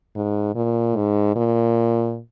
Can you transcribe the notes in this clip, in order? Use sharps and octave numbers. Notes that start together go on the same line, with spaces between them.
G#2
A#2
G#2
A#2